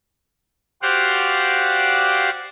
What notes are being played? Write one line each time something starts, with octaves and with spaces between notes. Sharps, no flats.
F#4 G4 C5 D5 F5 F#5